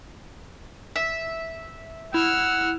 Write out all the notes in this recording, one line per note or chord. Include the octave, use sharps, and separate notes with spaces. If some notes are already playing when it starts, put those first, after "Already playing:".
E5
E4 F#5 E6 F6